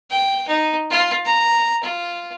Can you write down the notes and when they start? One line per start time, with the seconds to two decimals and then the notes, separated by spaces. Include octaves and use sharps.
0.10 G5
0.48 D#4
0.90 F4
1.25 A#5
1.83 F4